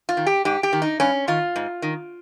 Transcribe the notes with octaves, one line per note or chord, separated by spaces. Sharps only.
F4
D#3
G4
G#2 G4
G4
D#3
D#4
G2 C#4
D#3 F4
G#2
D#3